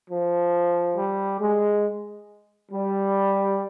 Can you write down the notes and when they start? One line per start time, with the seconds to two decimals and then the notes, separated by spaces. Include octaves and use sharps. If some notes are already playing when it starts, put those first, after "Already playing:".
0.10 F3
0.96 G3
1.41 G#3
2.71 G3